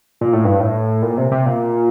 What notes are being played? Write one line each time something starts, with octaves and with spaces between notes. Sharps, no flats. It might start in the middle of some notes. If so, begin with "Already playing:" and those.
A#2
A2
G2
A2
A#2
C3
C3
A#2